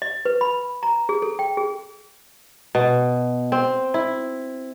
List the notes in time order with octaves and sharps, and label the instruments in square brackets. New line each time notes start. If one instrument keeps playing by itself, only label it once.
[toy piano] D#5
B4
B5
A#5
G#4
A4
G5
G#4
[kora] B2
C4
E4